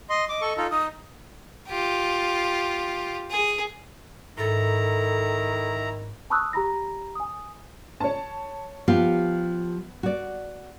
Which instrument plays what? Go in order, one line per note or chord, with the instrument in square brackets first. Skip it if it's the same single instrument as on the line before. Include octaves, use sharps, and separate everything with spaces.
[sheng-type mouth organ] D#5 C6
[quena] D#5 [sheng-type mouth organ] D6
[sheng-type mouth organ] A4 C#6
D#4 F4 A4
[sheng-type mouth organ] D#4 [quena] D#6
[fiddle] F4 G4
G#4
[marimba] G#2 A6 [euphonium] D#3 [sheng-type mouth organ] E4 A#5 [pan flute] A4
[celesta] A5 B5 C#6 D#6 E6 F#6
G4 A#5 B5 A#6
G#5 D#6
[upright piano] C#5 A5
[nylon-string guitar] F3 F4 G4 [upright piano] B3
[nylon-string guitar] F#4 D5